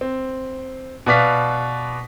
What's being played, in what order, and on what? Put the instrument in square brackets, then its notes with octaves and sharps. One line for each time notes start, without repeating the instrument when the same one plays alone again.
[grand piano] C4
B2 B4 D5 F5 B6